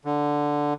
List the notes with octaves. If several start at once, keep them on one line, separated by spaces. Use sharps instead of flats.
D3